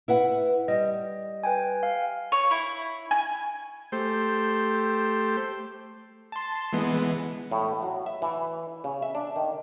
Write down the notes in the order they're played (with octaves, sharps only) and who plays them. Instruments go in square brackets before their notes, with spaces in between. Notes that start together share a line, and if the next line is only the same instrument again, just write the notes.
[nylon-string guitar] E4 B4 F#5
[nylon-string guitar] G3 [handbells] D#5
[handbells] B4 G5 G#5
F5
[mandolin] C#5
E4
G#5
[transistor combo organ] A3 G4 C5
[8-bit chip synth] A5 C6
E3 G#3 B3
[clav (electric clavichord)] A2
F#3
E5
E3
C#3
E5
D4
D#3